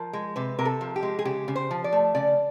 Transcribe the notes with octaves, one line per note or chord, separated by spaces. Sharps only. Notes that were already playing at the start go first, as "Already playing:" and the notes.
Already playing: F3 A#4
G#3
C3 B4
C3 A#4
A4
F3
G4
G#3
G#4
C#3 G4
C#3
C5
F3
D5
A3
C#3 D5